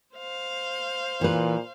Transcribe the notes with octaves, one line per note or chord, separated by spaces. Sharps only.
C5 F5
A#2 E3 B4